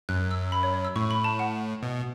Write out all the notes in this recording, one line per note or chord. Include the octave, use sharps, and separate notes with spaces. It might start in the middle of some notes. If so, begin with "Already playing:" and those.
F#2 F#6
E6
B5
C#5
C#5
E6
A2 C#6
B5
A5
F#5
B2